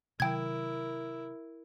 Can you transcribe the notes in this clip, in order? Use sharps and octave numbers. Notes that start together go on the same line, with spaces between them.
C3 D#3 F#3 E4 A#4 G5 G#6